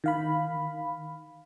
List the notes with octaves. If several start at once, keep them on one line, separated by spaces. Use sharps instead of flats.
D#3 F5 B5